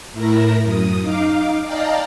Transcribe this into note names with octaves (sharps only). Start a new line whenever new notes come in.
A2 A3 E4 A#4 A#6
F#2 D#6
D#4 F5 D6
D5 D#5 F5 G5 A5 A#5